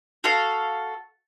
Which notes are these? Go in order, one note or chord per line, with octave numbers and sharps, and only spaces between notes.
F#4 A4 F5